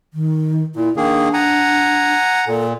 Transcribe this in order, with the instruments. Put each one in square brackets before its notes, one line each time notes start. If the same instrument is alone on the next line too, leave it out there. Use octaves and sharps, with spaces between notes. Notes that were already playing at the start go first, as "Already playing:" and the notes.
[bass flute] D#3
[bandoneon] A#2 [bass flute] E4
[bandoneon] D#3 A#3 G#4 [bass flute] D4
[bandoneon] F#5 G#5 A#5
[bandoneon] A#2 [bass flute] A4